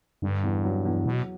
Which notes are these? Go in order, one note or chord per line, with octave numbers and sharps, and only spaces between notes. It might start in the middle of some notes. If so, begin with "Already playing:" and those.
G2 D3
E2
F#3
E2
B2 F#3